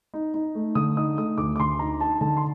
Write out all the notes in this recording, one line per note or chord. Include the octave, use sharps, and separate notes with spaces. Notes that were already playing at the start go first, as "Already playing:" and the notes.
D#4
D#4
A3
D3 D#6
D#4 D#6
A3 D#6
D2 D6
D6
D2 C6
D#4 A#5
D#4 A5
D3 A5
C6